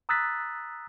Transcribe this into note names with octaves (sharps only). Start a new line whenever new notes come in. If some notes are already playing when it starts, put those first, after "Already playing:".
A#5 D#6 E6 F#6 A6 B6